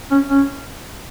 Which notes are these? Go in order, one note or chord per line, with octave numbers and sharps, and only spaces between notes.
C#4
C#4